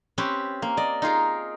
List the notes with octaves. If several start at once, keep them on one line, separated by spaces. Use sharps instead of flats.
C4 C#4 G4 B4
A#3
D5 D#5
D#4 F4 G#4 A#4